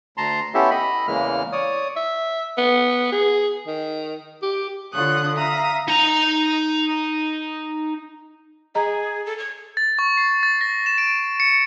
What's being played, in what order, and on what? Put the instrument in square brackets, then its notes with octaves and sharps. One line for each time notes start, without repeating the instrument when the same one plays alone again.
[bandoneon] D2 A5 A#5 C6
B3 C#4 E4 G4 A4 E5
D#5 B5
E2 C#3 E3 G#3 A#3 F6
C#5 D5 D#6
[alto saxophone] E5
B3
G#4
D#3
G4
[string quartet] D3 F4 C#5 D#6 F#6
E5 F5 A#5 D#6
[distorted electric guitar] D#4 A#5
[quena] G#4 [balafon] D#5 A#5
[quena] A4
G#6
[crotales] A6
C#6
C7
A6
A#6
E7
D7
C#7